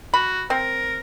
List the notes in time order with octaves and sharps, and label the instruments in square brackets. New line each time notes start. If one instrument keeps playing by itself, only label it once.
[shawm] F#4 [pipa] B5
[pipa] C4 [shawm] A#4